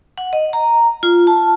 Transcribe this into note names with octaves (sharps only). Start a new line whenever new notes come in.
F#5
D#5
A#5
F4
A5